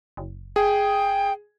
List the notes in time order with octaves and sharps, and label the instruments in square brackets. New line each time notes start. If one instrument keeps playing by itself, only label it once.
[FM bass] F#1
[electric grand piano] G#4 [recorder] G5